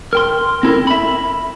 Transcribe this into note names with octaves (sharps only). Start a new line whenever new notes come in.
A#4 G5 C6
C4 E4 A4 A#4
E5 B5